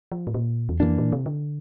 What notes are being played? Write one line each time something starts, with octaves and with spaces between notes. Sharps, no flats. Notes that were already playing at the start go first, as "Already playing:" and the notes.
F3
A2
A#2
E2
F2 E3 A#3 D4
A#2
C3
D3